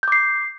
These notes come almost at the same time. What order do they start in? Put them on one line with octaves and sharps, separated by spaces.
G6 D6 C7